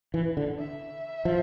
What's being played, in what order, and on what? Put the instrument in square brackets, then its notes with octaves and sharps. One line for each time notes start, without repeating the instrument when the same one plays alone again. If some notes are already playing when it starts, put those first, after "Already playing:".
[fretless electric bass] E3
D3
[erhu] E5
[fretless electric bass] F3